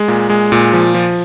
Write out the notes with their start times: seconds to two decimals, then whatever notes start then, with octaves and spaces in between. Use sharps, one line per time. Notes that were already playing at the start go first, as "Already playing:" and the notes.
Already playing: G#3
0.08 A#2
0.29 G#3
0.52 A#2
0.73 F3
0.94 F3